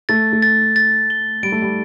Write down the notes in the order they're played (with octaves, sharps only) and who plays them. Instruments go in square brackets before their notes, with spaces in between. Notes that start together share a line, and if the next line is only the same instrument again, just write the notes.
[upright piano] A3 [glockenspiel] A6
[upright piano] A3
[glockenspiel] A6
A6
G7
[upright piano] G3 [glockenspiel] D7
[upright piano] A3
G3